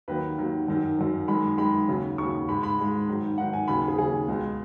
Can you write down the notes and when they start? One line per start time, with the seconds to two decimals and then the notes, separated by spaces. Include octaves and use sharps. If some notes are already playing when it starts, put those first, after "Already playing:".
0.08 D#2 D#3 F#3 B4
0.38 D#2 D#3 F#3
0.68 F#2 D#3 F#3
0.98 F#2 D#3 F#3
1.28 F#2 D#3 G#3 B5
1.58 F#2 D#3 G#3 B5
1.88 D#2 C#3 F#3
2.18 D#2 C#3 F#3 C#6
2.48 G#2 G#3 B5
2.63 B5
2.78 G#2 G#3
3.08 G#2 D#3 F#3
3.38 G#2 D#3 F#3 F#5
3.53 G#5
3.68 D#2 C#3 F#3 B5
3.88 G#4
3.98 D#2 C#3 F#3 G#4
4.28 C#2 B2 G#3